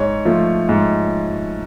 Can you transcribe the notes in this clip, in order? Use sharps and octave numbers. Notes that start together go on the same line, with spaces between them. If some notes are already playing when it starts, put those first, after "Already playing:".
Already playing: G#2 C#5
F3 A3
G#2